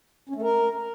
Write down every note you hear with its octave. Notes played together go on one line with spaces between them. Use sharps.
C#4
A3
A#4